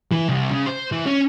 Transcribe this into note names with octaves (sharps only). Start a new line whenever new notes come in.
E3
C2
C#3
C5
E3
C#4